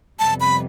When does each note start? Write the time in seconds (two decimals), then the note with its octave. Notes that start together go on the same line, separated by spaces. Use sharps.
0.19 F2 C3 G3 B3 A5
0.40 B5